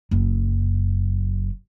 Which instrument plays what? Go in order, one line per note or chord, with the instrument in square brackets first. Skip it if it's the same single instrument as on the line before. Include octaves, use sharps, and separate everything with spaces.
[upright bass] F#1 F#2